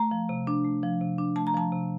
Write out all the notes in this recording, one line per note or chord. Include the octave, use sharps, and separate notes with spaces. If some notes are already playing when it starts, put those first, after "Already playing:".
Already playing: A3 A#5
F3
C3
D4
A3
F3
C3
D4
A3 A5
A#5
F3 A5
C3